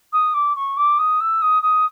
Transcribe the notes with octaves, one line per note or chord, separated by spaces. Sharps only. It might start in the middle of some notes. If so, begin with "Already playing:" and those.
D#6
D6
C#6
D6
D#6
E6
D#6
D#6